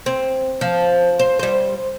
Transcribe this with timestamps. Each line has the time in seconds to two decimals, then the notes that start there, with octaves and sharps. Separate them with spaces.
0.06 C4
0.61 F3
1.19 C5
1.39 G3 C5